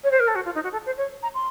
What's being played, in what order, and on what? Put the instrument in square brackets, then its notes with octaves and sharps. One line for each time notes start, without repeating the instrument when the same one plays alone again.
[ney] C#5
C5
A#4
A4
F#4
F4
D#4
F#4
A4
C5
C#5
A#5
C6